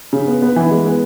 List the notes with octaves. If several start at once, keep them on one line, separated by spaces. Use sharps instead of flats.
C#3
B3
B3
E3
G#3
B3